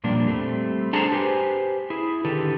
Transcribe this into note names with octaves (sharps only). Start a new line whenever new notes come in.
F2 A#2 G3 A#3 D4
G3 A3 C4
D4 G#4 A4 C5 A5 A#5
G4 B4 C5 G#5
E4 G#4
D3 D#3 G4 A4 B4